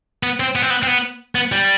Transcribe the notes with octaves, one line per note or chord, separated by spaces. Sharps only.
B3
C4
B3
C4
B3
C4
B3
B3
G3